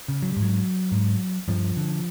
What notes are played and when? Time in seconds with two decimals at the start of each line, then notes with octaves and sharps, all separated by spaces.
0.08 C#3
0.23 F#3
0.32 G#2 G3
0.42 F#3
0.92 G#2
1.48 G2 F3
1.77 D3